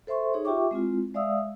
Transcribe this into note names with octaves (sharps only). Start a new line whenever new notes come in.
A4 C5 E5 C6 C#6
D#4 G#4 C#5
F4 G4 E5 G5 C#6 D6
G#3 C4 E4 F4
G#3 D5 E5 F5 D#6 E6